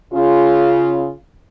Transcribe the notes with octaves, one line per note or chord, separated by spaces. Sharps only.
C#3 F4